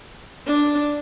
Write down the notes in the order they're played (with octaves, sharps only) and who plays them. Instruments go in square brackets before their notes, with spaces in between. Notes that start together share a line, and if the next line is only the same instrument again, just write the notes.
[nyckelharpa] D4